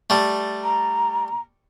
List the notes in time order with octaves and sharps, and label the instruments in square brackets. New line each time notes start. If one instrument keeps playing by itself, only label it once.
[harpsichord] G3 A3
[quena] A#5